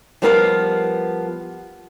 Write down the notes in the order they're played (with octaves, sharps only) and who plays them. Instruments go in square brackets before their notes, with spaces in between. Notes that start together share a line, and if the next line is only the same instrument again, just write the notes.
[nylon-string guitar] F3 G3 B3 A#4 D#5 F5